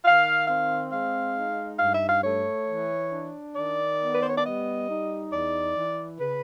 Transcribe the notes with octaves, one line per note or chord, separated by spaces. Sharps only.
D#3 F5
C4 F5
G#3 F5
D#4
G2 F5
E5
F5
A3 C#5
E3
D4
D#3 D5
B3
B4
C5
C#5
D5
G3 D#5
D#4
E2 D5
E3
C#3 B4